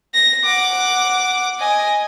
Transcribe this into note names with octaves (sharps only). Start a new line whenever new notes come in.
A#6
F#5 D6
D#5 G#5